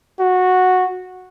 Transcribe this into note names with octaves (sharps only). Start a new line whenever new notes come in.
F#4